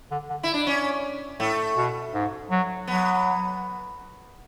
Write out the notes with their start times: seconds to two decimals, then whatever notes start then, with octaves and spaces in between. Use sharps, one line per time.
0.11 D3
0.30 D3
0.43 E4
0.54 D4
0.67 C#4
1.40 A2 A3
1.77 B2
2.14 G#2
2.51 F#3
2.88 F#3 B3